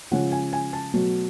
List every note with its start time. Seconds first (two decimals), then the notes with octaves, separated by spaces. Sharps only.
0.11 C#3 F3 G#3 C#4 F4 F#5
0.32 G#5
0.53 G#5
0.73 A5
0.94 B2 F#3 A3